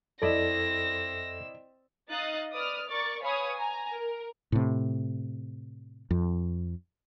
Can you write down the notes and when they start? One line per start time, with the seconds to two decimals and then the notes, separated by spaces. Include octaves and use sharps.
0.22 F2 C4 E4 A4 D5 D#5 E6 A#6
2.11 D#4 D#5 F5 D#6 F#6 A6
2.51 B4 D5 D#6 F6
2.89 A#4 D5 C#6 A6
3.22 B4 C#5 F5 G#5 B5 D#6
3.56 G#5 A#5
3.93 A#4
4.52 A2 C3
6.11 F2